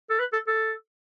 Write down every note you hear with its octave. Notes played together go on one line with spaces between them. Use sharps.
A4
B4
A4
A4